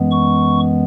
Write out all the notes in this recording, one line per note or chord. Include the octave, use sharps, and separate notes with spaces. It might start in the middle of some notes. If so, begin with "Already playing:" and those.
Already playing: F#2 E3 G#3 B3
C#6